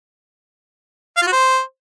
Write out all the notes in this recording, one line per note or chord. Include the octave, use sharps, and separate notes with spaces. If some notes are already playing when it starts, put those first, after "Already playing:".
F5
F4
F#4
C5